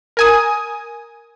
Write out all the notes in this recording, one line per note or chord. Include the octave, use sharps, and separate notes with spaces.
A#4 G#5 D#6